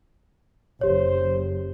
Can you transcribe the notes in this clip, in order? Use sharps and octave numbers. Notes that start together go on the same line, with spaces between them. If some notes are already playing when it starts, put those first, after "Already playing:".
F#1 G4 C5 C#5